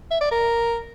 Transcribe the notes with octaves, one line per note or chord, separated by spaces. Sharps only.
E5
D5
A#4